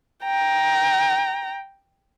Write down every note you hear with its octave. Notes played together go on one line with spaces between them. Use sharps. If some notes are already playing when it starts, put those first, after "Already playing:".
G5 A#5